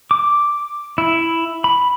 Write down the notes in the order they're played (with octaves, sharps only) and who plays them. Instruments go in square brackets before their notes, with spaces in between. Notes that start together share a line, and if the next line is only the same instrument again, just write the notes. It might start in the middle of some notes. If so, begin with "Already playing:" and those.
[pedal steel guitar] D6
E4
B5